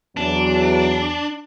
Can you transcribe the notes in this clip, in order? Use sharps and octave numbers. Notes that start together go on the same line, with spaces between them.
E2 F#3 D4